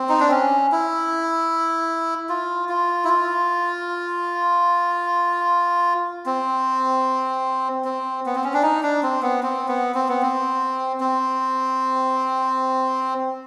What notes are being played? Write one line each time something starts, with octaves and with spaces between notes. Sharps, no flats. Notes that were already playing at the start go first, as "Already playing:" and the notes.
Already playing: C4
D#4
D4
C#4
E4
F4
F4
E4
F4
C4
C4
B3
C4
C#4
D4
D#4
D4
C4
B3
C4
B3
C4
B3
C4
C4